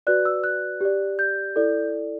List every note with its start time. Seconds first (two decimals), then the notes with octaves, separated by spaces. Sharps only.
0.07 F#4 B4 D5 F#6
0.25 E6
0.44 F#6
0.81 G4 D5
1.19 G6
1.56 E4 A4 D5